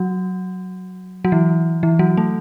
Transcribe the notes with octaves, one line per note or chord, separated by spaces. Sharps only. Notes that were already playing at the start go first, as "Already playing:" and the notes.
Already playing: F#3
F#3
E3
E3
F#3
A3